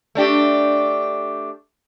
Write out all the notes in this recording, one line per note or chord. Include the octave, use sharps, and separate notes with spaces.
A3 D4 G4